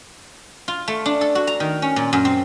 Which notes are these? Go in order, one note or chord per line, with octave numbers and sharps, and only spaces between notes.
F4
A3
D4
A4
F#4
A#5
D#3
C#4
A#2
F#2
C4